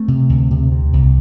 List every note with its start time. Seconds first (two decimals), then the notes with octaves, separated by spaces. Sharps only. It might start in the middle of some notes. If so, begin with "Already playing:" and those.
Already playing: A3 C4
0.08 C3
0.29 D2
0.51 C3
0.72 C3
0.93 C2